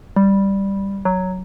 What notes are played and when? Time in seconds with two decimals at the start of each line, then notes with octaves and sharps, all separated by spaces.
0.16 G3
1.05 F#3